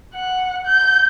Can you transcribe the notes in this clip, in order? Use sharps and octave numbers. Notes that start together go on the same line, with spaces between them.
F#5
G6